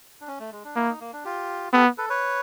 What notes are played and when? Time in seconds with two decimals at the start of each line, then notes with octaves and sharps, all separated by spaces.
0.21 D4
0.28 C#4
0.40 A3
0.52 G#3
0.64 D4
0.76 A#3 E4
0.89 D#4
1.01 A#3
1.13 D4
1.25 F4 G4
1.73 B3 G4 A4
1.98 A4 B4
2.10 B4 C#5